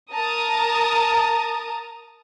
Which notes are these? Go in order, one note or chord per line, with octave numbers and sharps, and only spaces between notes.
A#4 A5 A#5 D#6